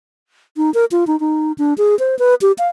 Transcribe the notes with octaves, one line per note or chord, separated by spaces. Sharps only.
D#4
A#4
F4
D#4
D#4
D4
G#4
C5
B4
G4
F5